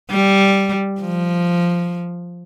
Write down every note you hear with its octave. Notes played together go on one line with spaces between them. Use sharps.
G3
F3